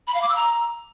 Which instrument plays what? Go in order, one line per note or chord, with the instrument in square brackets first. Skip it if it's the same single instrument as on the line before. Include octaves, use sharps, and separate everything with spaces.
[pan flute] B5
F5
D6
E6
A#5